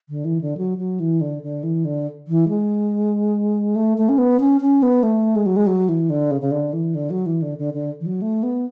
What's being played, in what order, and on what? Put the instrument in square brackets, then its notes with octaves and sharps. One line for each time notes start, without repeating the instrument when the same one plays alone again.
[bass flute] D3
E3
D3
F#3
F#3
E3
D3
D3
E3
D3
E3
G#3
A3
A3
C#4
B3
C#4
C#4
B3
A3
G#3
F#3
G#3
F#3
E3
D3
C#3
C#3
D3
E3
D3
F#3
E3
D3
D3
D3
E3
F#3
A3
B3